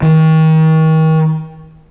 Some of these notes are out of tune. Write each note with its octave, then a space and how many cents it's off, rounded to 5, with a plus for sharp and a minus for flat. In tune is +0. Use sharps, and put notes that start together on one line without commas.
D#3 +35